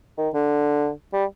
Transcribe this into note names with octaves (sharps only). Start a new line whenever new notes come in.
D#3
D3
G3